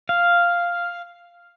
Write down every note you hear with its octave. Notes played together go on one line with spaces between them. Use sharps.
F5